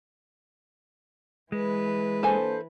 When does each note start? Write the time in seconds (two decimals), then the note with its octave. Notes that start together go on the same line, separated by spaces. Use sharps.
1.52 E3 G#3 B4
2.23 A#3 D4 A4 C5 G#5